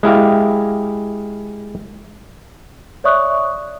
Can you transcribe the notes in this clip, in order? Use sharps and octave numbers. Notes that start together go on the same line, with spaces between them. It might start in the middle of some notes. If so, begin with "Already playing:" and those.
G#3 E4 G4 F5
C#5 D5 E5 C#6 D#6 F#6